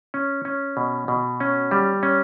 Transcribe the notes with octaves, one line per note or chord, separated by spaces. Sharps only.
C#4
C#4
B2
B2
C#4
G3
C#4